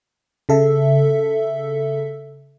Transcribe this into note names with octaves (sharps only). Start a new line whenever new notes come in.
C#3 A4 E5